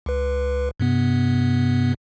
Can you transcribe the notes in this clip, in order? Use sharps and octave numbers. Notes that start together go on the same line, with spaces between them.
C#2 B4
G2 C3 B3